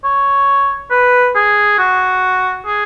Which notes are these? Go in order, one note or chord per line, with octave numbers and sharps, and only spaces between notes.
C#5
B4
G#4
F#4
G#4